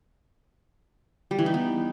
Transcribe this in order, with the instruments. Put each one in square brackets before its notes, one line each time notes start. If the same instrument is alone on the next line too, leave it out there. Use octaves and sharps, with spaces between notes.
[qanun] G3
E3
D#4
B3